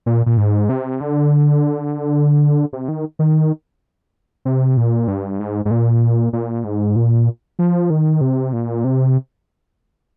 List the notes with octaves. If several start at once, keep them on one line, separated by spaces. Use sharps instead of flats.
A#2
A#2
G#2
C3
D3
C3
D#3
D#3
C3
A#2
G2
G#2
G#2
A#2
A#2
G#2
A#2
F3
D#3
C3
A#2
C3